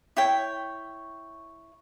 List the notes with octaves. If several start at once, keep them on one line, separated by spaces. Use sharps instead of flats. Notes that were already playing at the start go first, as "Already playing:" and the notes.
E4 C#5 G5